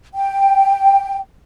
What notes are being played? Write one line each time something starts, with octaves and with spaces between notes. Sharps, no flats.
G5